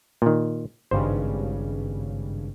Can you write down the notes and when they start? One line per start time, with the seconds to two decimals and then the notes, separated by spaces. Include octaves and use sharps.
0.22 A#2 D#3
0.91 G#1 G2 C#3 C5